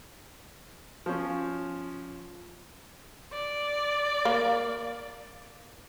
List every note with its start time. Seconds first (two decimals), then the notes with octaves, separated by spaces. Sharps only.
1.06 F3 C#4
3.33 D5
4.25 A#3